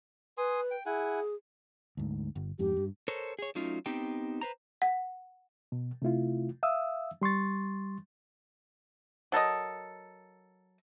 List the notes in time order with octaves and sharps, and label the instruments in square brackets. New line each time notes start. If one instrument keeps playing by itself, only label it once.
[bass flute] B4 [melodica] G#5 C6 D#6
[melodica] G5
[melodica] E4 F#5 G#5 [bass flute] G#4
[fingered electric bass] D2 G#2
G1
[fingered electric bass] F2 G#2 [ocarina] G4
[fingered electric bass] G2
[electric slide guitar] A4 A#4 C5 C#5
G#4 C#5
F#3 A3 C#4 D#4 F4
B3 C4 D#4 G4 G5
B4 C5 A#5
[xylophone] F#5
[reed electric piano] B2
C3 A3 E4 F4
E5 F5 D#6 E6
G3 C6 C#6 A6
[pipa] F#3 A4 A#4 D#5